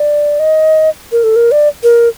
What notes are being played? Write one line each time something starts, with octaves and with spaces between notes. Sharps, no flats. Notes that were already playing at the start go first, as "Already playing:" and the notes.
Already playing: D5
D#5
A#4
A4
A#4
D5
A#4